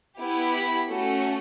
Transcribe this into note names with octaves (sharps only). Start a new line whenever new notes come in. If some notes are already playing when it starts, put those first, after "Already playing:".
B3 E4 G4
B5
A3 C#4 F#4 A4